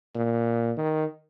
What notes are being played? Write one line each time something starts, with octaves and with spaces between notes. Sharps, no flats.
A#2
D#3